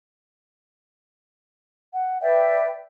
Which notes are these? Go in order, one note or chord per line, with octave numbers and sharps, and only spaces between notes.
F#5
B4 D5 E5 G5